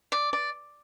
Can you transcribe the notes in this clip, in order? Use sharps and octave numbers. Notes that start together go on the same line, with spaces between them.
D5
D5